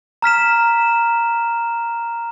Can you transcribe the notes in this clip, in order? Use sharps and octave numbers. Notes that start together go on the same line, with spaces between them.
A#5 F6 B6 E7